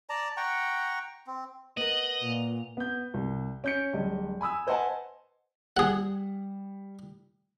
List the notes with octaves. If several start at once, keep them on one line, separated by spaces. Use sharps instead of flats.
D5 A5 A#5
F#5 G5 A#5 C#6
C4
B3 A#4 D#5 F#7
A#2 F7
B3 G6
C2
C#4 G6 C#7
D1 G3 D#5
G#5 B5 D#6 E6
B4 C5 D#5 F#5 G#5 A5
G3 G#4 F#5